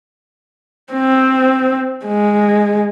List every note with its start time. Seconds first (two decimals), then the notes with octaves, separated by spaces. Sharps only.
0.93 C4
2.06 G#3